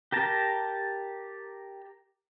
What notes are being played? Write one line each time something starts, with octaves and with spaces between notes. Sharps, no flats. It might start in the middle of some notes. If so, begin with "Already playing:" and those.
G4 A#4 A5 A#5